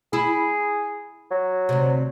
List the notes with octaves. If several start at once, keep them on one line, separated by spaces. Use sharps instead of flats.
E4 G#4
F#3
D2 C3